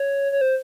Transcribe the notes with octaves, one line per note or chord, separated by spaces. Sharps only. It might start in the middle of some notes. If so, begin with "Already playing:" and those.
Already playing: C#5
C#5
C5